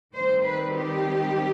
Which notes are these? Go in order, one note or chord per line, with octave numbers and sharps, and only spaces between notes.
D#3 G3 C4 C5
B4
G4